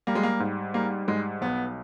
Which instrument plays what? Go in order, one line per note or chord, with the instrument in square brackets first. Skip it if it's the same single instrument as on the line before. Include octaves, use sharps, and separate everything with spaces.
[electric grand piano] G3 [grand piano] A#3
[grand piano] G#3
A#3
[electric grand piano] G#2
[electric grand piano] G3 [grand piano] A#3
[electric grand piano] G#2 [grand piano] G#3
[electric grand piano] B1 [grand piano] B3